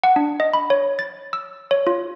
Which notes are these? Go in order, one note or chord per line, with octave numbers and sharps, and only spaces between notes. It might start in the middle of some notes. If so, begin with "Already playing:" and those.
F#5
D4
D#5
B5
C#5
A6
E6
C#5
F4